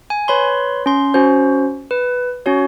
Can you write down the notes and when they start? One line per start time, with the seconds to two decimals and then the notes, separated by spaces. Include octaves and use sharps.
0.10 G#5
0.28 B4 C#5 B5 C6
0.86 C#4 C6
1.14 C#4 F#4 C5
1.91 B4
2.46 C#4 F#4 C#5